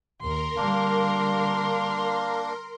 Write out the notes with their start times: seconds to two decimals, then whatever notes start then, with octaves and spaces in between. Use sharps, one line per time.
0.21 D#2 A#4 C6
0.57 D3 G3 A#3 D4 F5